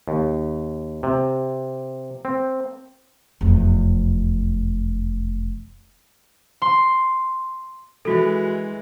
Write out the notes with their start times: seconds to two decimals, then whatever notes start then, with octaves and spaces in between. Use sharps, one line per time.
0.08 D#2
1.03 C3
2.25 C4
3.41 F1 E2
6.62 C6
8.05 E3 G#3 F#4 A4